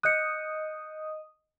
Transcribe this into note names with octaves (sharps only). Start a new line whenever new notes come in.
D#5 D#6 F#6 G6 C#7